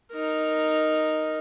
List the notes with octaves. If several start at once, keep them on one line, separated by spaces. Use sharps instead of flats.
D#4 A#4